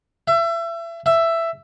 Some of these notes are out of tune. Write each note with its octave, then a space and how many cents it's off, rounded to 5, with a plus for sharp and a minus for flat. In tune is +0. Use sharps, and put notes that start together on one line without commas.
E5 +30
E5 +10